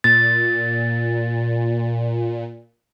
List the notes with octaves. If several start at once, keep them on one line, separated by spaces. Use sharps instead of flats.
A#2 A6